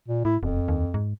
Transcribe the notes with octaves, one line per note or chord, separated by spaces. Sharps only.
A#2
A2 E4
E1 F2
D#2
G#2